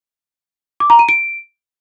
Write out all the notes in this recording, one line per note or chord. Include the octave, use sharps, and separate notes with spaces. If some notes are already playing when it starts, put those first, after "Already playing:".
D6
A#5
D#7
D7